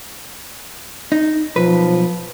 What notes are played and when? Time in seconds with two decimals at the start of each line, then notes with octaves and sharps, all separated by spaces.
1.12 D#4
1.56 B1 F3 B4